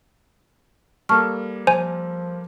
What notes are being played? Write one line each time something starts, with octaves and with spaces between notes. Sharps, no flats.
G3 A#3 A4 A5 C#6 F6
F3 C5 G#5